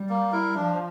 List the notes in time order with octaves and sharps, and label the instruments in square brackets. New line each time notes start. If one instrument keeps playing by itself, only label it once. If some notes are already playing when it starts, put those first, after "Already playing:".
Already playing: [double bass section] G3
[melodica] A#3
E4 A#4
[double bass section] F3 [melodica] D4